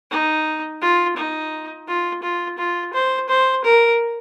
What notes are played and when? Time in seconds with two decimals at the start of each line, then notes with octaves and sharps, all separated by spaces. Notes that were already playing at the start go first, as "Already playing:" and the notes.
0.11 D#4
0.82 F4
1.17 D#4
1.88 F4
2.23 F4
2.59 F4
2.94 C5
3.29 C5
3.65 A#4